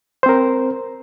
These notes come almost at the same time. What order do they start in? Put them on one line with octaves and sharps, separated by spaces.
C5 C4 A#4